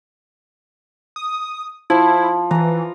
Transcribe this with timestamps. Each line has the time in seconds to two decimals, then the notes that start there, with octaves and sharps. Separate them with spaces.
1.16 D#6
1.90 F3 E4
2.51 E3 B4 A#5